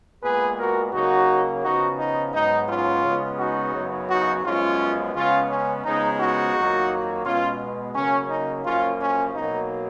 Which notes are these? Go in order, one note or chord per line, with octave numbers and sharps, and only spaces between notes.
A#2 G#3 B3 G#4 B4
F#4 A#4
C#3 F#3 A#3 D#4 F#4
C#3 F3 B3 D#4 F#4
D#4
G#2 F#3 B3 D#4
C#4 F4
C#3 G#3 B3
D#4 F#4
F#2 C#3 F#3 B3
D#4 F#4
F#2 F3 G#3 B3 C#4 F4
C#3 G#3 B3 C#4 F4
C#4
C#3 F3 G#3 B3 D#4
D#4 F#4
F2 D#3 F#3 A#3
B2 G#3 B3 C#4 F4
C#3 F#3 A#3 C#4
D#4
F#2 F3 A#3 C#4 F4
C#4
B2 F#3 A#3 D#4